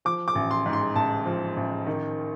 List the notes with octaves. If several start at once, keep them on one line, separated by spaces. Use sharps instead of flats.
F3 D6
D6
A1
C6
G#2
C6
A1 A5
F3
A1
D#3